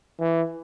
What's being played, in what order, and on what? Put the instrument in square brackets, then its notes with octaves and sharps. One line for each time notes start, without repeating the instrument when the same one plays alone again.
[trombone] E3